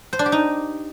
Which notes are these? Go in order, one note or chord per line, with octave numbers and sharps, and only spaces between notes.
C5
D4
G4
D#4